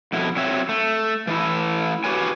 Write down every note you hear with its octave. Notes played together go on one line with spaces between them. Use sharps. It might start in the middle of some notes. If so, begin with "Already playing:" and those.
F2 B2 E4
F#3 C4 C#5 E5
A3
E3 A3 E4
F#4 G4 B4 C#5 G#5